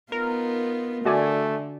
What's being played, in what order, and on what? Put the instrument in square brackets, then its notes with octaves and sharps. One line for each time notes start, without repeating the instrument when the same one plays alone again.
[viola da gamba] B3 D#4 F4 [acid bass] A#4
[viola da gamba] D3 [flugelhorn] A3 [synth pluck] F#4 D5 G#5